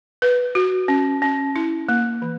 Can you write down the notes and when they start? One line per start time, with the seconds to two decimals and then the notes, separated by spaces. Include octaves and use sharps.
0.22 B4
0.55 F#4
0.88 C#4
1.22 C#4
1.56 E4
1.89 A#3
2.22 E3